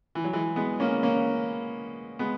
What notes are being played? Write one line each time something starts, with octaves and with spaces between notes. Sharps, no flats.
E3
F#3
E3 G#3
G#3 B3
A#3 C#4
A#3 C#4
G#3 B3